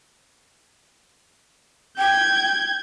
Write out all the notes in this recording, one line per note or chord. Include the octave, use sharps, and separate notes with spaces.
G5 G6 G#6